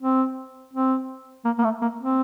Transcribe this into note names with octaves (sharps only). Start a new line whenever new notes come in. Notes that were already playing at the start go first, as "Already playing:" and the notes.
C4
C4
A#3
A#3
A3
A#3
C4